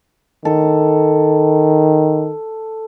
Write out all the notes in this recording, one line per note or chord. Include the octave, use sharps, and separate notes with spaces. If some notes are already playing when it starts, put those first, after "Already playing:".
D#3 A4